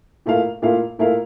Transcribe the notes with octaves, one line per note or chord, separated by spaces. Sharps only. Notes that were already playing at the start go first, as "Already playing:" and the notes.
A#2 A3 E4 A#4 F5
A#2 A3 E4 A#4 F5
A#2 A3 E4 A#4 F5